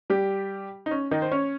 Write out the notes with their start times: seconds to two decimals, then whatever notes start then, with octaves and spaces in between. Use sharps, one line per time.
0.10 G3 G4
0.86 D#4
0.91 C#4
1.11 D#3 D#4
1.22 C5
1.31 C#4 C#5